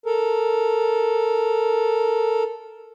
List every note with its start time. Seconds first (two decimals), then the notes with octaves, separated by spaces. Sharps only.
0.06 A4 A#4